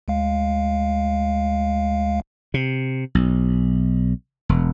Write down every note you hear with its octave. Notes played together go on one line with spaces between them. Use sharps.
D2 G#3 F5
C3
B1
E1